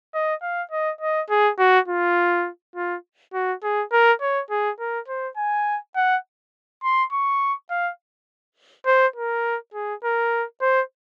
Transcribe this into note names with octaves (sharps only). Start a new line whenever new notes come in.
D#5
F5
D#5
D#5
G#4
F#4
F4
F4
F#4
G#4
A#4
C#5
G#4
A#4
C5
G#5
F#5
C6
C#6
F5
C5
A#4
G#4
A#4
C5